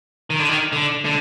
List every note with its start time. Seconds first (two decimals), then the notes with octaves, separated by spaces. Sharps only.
0.30 D#3
0.39 D3
0.49 D#3
0.73 D3
1.05 D3